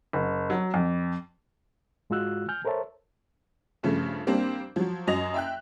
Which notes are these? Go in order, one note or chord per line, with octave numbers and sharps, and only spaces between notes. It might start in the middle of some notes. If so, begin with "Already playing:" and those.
F#1
F#3
F2
G#2 G#3 F4 F#4 E6 F#6
G#5 F6 G6
A4 A#4 C5 C#5 E5 A5
G2 C#3 F3 A3
G3 A#3 C4 D4
F3 F#3
F#2 F#3 D#5 A#6 F7
E5 G5 F#6